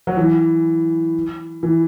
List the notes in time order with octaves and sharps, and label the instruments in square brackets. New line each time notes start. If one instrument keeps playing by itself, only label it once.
[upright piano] F#3
E3
E3